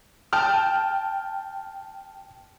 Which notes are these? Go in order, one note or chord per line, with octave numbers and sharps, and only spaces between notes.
G5 A5 F6